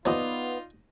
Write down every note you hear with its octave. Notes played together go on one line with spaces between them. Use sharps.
D#2 F3 B3 D#4 F4 D5 D#5